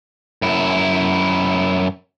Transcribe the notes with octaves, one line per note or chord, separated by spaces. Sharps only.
F#2 E4